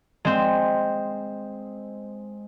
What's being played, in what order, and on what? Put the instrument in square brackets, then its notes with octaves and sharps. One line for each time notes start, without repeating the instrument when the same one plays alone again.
[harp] G#3 C4